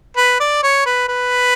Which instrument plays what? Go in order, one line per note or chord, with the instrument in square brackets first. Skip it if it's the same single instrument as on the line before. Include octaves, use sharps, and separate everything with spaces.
[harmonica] B4
D5
C#5
B4
B4